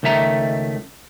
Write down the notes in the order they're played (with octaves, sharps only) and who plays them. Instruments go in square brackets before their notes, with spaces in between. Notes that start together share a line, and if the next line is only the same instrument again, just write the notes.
[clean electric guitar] C#2 D#3 A3 E5 A#5